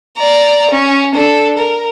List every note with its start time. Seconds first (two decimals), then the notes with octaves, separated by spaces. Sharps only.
0.17 D5 A#5
0.70 C#4
1.14 D4 A4
1.58 A#4